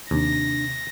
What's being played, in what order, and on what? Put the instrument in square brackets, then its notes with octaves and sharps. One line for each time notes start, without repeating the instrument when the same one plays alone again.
[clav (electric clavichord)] D#2 [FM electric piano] C3 [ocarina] D4 [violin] A#6